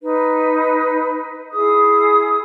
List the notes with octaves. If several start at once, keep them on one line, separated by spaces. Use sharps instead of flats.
D#4 B4
E4 G#4 D#6